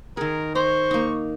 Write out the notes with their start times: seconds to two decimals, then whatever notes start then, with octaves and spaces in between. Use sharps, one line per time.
0.17 D#3 G#4 A#4
0.55 C5 A#5 C#6
0.91 A#3 D#4